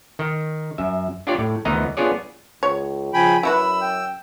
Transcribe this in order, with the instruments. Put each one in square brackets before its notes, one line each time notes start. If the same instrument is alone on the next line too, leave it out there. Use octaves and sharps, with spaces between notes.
[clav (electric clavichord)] D#3
F#2 E5
D4 F4 G4 C#5 D5
A2
D2 D#3 E3 B3 D#5 A#5
B3 D4 F4 G#4 C#5 D5
[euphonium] C#2 [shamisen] C#5
[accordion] C#3 G5 B5 [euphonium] F3 [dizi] G#5
[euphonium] F#2 [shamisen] E4 F#4 B4 [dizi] B5 [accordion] E6
[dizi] G5